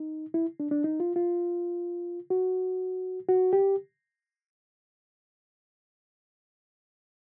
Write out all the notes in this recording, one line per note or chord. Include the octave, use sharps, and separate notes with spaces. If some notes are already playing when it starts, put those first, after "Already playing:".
Already playing: D#4
E4
D4
D4
D#4
F4
F4
F#4
F#4
G4